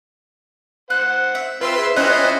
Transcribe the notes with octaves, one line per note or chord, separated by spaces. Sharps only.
C5 F#5 F#6
E5
C4 F4 B4 C6 E6
G#4 E5
C#4 E4 F4 C5 C#5 D#5 G5 F#6